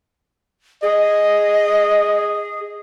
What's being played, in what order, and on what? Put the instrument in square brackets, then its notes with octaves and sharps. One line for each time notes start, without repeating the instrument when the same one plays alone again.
[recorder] G#4 [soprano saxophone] D#5